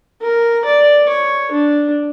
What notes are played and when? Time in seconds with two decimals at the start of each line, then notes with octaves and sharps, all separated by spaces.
0.21 A#4
0.65 D5
1.08 C#5
1.52 D4